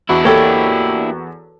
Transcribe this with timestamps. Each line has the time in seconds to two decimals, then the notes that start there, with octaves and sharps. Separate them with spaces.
0.09 E2 D4 E4 F#4 B5
0.25 A#3 G4 A4 C#5